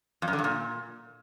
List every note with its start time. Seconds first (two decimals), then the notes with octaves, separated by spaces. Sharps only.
0.22 F2
0.28 F#2
0.33 D3
0.39 G2
0.44 A#2